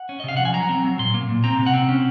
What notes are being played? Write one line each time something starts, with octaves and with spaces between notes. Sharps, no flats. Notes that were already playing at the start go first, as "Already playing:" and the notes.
Already playing: F#5
C#4
D#5
C3 F5
F3 F#5
G#5
F#3 A#5
C4
F#3
A#2 C6
A#3
A#2
C4 A#5
C3
F#5
C4
C#4